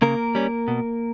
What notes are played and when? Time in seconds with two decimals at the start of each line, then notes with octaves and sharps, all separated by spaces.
0.02 C#3 A#3 A#4
0.35 G3 C#4
0.68 B2